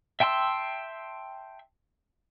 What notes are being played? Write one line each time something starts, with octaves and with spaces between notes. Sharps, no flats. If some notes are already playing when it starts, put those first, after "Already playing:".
E5 G5 A5 C6 E6